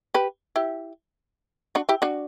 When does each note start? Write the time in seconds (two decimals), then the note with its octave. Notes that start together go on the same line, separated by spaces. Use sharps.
0.14 G4 B4
0.56 E4 G4
1.75 D4 F#4
1.89 E4 G4
2.02 D4 F#4